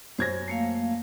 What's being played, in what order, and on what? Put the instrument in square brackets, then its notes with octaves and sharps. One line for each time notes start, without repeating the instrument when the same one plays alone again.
[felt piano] F#2 G#6 A#6 [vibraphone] C5
[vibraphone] A3 A#3 F5